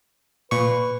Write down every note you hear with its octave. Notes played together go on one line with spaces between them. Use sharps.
A#2 B4 C#6